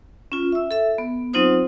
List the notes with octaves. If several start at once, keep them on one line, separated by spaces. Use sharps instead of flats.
C#4 F4
E5 E6
A4 E5
B3
F#3 C4 D#4 F4 C5 D#6